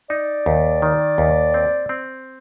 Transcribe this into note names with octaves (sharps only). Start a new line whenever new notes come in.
D#4 D5
D#2
D#3
D#2
C4
C4